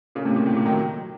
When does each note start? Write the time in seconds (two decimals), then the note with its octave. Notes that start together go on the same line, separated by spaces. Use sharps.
0.15 A#2 C#3
0.25 A2 C3
0.36 A#2
0.46 A2
0.56 A#2
0.66 D#3 F#3